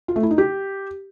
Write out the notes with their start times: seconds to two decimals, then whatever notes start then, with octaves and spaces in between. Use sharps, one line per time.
0.08 F4
0.16 A3
0.23 E4
0.31 D#4
0.38 G4